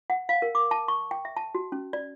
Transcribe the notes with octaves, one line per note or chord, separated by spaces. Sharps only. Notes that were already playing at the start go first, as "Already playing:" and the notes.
F#5
F5
A#4
D6
A5
C#6
G5
E5
A5
F#4
C#4
D5